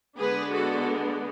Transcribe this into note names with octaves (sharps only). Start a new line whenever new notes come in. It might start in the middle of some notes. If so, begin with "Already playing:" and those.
D3 G#3 B3 D4 G#4 B4
F#4 A4